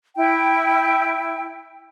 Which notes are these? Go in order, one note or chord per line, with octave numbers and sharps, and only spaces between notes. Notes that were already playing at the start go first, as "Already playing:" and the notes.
E4 G5